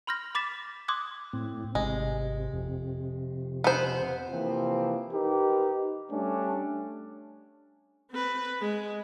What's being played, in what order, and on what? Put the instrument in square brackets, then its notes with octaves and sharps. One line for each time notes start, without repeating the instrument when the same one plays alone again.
[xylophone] B5 C6 F6 G6 A#6
B5 D6 A6 B6 E7
C6 D6 D#6 F#6 G#6
[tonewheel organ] A2 [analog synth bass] C4
[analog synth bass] G#1 [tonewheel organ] C3 [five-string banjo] G#3
[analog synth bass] F2
[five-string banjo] B3 C5
[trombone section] C3 E3 F3 A#3 C4
D#4 G4 A#4 B4
G3 A3 C#4 D4
[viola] C4 B4
G#3